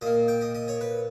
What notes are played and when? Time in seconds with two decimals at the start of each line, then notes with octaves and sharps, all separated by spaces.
0.01 A#2 A#3 D#5
0.28 G5
0.41 D#5
0.55 D#5
0.68 C#5
0.81 B4